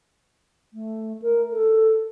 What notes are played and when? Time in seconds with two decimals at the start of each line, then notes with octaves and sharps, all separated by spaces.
0.73 A3
1.22 A#4
1.52 A4